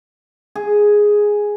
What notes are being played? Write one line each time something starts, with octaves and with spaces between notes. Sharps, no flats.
G#4